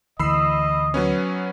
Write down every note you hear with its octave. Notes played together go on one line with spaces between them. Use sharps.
D2 E3 D#5 B5 E6 C7
F#3 B3 C#4